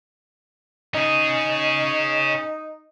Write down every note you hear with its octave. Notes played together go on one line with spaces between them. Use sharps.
C#4 D#4 G#4